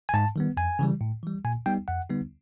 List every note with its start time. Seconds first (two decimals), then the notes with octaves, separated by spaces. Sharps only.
0.09 G#5
0.14 G#2 A5
0.36 D#3 G3 B3
0.57 F2 G#5
0.79 C#3 E3 G3
1.01 A2
1.23 E3 G3
1.45 A#2 G#5
1.66 G3 B3 D#4 G5
1.88 F2 F#5
2.10 D3 G3 B3 D#4